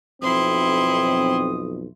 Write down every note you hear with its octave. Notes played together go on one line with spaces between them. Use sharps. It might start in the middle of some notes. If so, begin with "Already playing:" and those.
B1 F2 C4 E4 C6 D#6